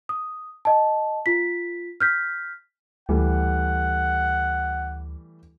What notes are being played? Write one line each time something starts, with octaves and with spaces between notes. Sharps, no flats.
D#6
D#5 A5
F4 B6
F6 G6 B6
D2 E3 G3 A3 F#5